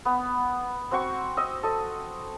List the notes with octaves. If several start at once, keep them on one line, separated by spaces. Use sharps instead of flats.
B3
C4 F#4 C#6
D#5 E6
A4 D#5